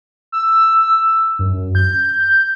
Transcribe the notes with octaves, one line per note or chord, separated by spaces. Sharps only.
E6
F#2
G6